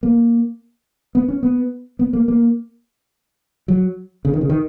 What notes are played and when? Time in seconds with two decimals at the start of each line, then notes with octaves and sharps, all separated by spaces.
0.03 A#3
1.15 B3
1.28 C#4
1.43 B3
1.99 B3
2.13 A#3
2.28 A#3
3.68 F#3
4.25 C#3
4.33 D#3
4.41 C#3
4.49 D#3